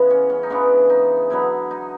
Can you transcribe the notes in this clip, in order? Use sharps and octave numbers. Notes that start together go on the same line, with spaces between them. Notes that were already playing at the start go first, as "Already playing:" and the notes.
Already playing: C#3 E3 G#3 B3
C#4
C#4
D#4
C#3 E3 G#3 B3 D4
D#4
D3 F#3 B3 E4
D#4